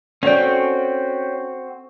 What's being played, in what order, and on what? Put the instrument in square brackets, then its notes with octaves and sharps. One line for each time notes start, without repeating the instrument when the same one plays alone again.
[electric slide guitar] C4 F#4 [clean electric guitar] C#4 G5 [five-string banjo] A4 D5